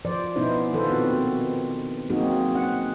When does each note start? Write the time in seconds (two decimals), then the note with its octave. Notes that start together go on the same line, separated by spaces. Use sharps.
0.05 F3 C5 D5
0.36 B2 B3 C#4 D#4 E4 C5
0.73 D#3 B3 F4 A4 B4 C5
0.90 A#2 C4 F#4
2.10 F#3 A#3 C4 D#4 F#4 G#4
2.55 C#4 F#5